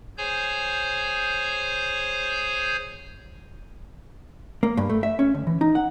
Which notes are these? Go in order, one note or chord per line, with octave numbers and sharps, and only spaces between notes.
G#4 C5 C#5 G#5 G6
A#3
G2
A3
E5
C#4
D2
E3
D#4
F#5